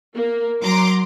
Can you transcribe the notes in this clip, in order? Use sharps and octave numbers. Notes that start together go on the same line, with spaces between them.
A#3
F#3 A#5 C6 D6